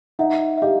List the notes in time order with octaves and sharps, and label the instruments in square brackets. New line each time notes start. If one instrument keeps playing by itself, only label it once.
[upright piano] D#4 [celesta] E5 F#5
[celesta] E5
[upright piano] G4 [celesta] D#5 F5